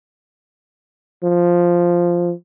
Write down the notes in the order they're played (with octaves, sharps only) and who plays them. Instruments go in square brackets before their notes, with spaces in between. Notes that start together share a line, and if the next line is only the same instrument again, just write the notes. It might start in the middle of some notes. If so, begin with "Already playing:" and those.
[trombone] F3